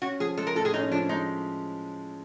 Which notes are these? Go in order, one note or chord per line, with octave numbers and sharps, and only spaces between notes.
C#4 F#4
F3 G#4
G#3 A4
A#4
A2 A4
G#4
C#4 D#4
F3 D4
G#3 D#4